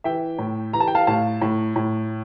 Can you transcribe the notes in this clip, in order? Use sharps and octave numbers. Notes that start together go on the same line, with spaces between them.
E3 E5 G5
A2
E3 A#5
A5
G5
F5 A5
A2 F5 A5
A2
A2